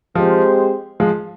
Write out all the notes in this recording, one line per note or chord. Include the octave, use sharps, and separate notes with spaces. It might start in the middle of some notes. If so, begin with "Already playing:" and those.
F3 G#3 C4 G4 C5
F3 G#3